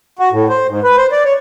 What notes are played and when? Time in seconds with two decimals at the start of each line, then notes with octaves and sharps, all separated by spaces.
0.19 F#4
0.32 A2
0.49 C5
0.68 G#2
0.84 B4
0.97 C5
1.12 D5
1.25 C#5